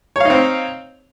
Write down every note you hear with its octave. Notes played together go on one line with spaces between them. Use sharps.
C4 D#4 C#5 F5